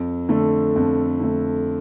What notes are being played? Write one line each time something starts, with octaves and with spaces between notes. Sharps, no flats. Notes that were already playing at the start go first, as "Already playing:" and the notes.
Already playing: F2
D3 A3
F2
D3 A3